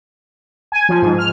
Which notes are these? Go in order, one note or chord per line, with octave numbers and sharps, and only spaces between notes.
G#5
F3
G#2
F6